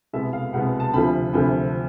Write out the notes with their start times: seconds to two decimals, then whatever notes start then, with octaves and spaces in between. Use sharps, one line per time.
0.13 C2 B2 G#3 B3 E5
0.33 F5
0.53 C2 B2 G#3 B3 F#5
0.80 A5
0.94 D2 C3 F3 B5
1.33 D2 C3 F3 B5